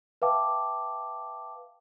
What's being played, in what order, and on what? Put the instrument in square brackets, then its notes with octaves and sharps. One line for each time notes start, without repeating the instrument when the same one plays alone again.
[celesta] B4 E5 F5 G5 A5 D6